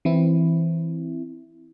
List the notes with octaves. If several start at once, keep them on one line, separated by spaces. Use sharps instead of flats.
E3 C4 E4